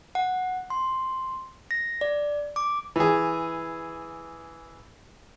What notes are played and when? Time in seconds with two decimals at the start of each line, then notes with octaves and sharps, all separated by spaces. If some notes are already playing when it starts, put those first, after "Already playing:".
0.15 F#5
0.70 C6
1.71 A#6
2.01 D5
2.56 D6
2.96 E3 G#4